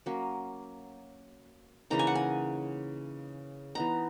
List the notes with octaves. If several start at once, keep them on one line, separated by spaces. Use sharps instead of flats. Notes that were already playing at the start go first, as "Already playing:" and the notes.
F#3 A#3 C#4
C#3 E3 A#3 D#4 A#5
G#5
F#5
G#5
E3 B3 D#4 A#5